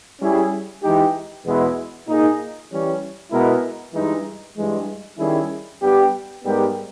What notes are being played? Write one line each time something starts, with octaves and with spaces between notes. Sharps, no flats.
G3 C#4 E4 G#4
E3 G#3 D#4 G4
E2 B2 G#3 B3 E4
A#2 A#3 D#4 G#4
E3 G3 C#4
B2 G#3 B3 E4 A#4
G2 E3 G#3 D#4
G2 E3 G#3
D#3 G3 C#4 E4 G#4
G2 G3 B3 G4
G#2 G3 B3 G4 A#4